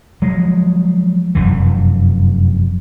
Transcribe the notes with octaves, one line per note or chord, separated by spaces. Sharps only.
F3 F#3 G#3
F1 F#2 E3